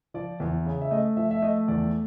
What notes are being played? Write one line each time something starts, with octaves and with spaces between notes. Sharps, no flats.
F3 D5
E2
C#3
E5
A3 D#5
F3 E5
E5
A3 D#5
E2 D5